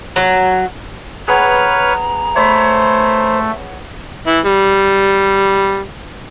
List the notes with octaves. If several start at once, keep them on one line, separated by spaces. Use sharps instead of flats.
F#3
B3 G#4 B4 C#5 A#5 F6
A3 C5 C#5 B5
E3 E4
G3